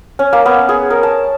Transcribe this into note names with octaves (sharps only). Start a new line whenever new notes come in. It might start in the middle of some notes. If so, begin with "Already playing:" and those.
C#4
A#3
B3
G#4
A#4
A5